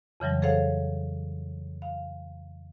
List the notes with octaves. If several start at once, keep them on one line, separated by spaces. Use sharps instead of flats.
F2 C#3 E3 F#3 G3
G#4 A4 C5 C#5 F5 F#5
F5